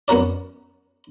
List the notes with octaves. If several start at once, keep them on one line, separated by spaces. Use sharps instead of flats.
F#2 B3 F#4 A#4 D5